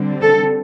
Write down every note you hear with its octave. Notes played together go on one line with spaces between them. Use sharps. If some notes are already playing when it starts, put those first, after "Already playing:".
Already playing: D3 G3 C4
A4